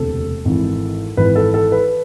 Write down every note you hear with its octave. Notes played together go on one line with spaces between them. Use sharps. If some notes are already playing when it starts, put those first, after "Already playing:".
Already playing: E1 D2 C3 A4
G#1 G#2 E3
G#1 G#2 E3 B4
A4
A4
B4